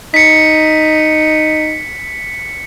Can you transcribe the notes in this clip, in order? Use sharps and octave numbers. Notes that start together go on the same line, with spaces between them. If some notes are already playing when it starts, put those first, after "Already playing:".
D#4 B6 C#7